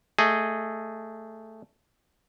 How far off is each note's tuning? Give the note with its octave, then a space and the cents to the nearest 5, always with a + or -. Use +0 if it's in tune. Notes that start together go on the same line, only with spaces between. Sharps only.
A3 +5 G#4 +0 D#5 +0